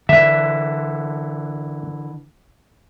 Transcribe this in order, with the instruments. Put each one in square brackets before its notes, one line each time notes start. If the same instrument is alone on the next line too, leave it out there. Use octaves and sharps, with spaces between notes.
[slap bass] D3 E3 [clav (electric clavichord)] E5